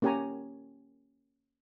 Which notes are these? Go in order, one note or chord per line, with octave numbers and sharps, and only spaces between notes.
A#3 C#4 G4 C#5 G#5 A#5